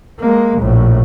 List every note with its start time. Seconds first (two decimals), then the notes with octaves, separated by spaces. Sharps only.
0.20 G#3 A#3
0.60 A#1 A2